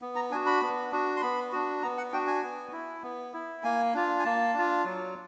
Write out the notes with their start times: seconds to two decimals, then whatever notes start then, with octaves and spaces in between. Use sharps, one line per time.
0.02 B3
0.16 A#5
0.31 D4 G#5
0.35 F#4
0.46 B5
0.62 B3
0.92 D4 F#4
1.17 C6
1.22 B3 B5
1.52 D4 F#4
1.82 B3 A#5
1.98 F#5
2.12 D4 F#4 G5
2.27 G#5
2.43 B3
2.72 E4
3.03 B3
3.34 E4
3.64 A#3 G#5
3.94 D4 F4
4.19 G#5
4.24 A#3 A5
4.54 D4 F4
4.84 F#3